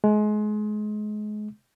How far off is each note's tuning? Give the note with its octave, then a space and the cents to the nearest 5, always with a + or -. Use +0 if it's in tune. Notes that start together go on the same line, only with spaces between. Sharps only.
G#3 +30